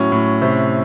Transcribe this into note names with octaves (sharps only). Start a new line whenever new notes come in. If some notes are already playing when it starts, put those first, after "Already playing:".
Already playing: A2 F#3 C#4
A2
C3